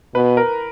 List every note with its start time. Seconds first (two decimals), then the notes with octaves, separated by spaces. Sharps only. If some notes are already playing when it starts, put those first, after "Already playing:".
0.15 B2 B4
0.37 A#4